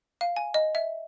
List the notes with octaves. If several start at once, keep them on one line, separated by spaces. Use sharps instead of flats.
F5
G#5
D#5
E5